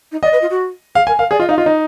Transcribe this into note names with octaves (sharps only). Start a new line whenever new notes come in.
D#4
D5 D#5
B4
F4
F#4
G#4 F5
A#4 G#5
A#4 F5
G#4 D5
F4 D#5
D#4 F5
F4 D#5
D#4